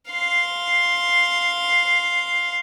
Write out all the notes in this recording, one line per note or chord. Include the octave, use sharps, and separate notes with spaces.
F5 C6